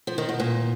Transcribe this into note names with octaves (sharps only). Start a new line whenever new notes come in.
F3
D#3
B2
A#2